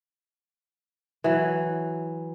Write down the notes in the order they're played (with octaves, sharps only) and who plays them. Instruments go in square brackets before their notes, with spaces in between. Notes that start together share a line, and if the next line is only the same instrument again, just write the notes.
[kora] E3 F#3